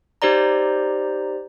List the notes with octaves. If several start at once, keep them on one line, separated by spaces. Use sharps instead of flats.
D#4 G4 C5 D5 A#5